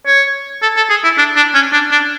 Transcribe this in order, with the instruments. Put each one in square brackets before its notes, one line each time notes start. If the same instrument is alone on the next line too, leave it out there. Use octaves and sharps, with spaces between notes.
[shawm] C#5
A4
A4
G#4
E4
D4
D4
C#4
D4
D4